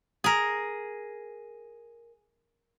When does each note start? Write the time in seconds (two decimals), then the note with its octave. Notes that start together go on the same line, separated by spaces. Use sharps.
0.24 G#4 A#4